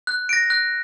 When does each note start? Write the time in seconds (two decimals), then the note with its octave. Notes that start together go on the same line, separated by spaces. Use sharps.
0.07 F#6
0.29 A#6 D7
0.50 F#6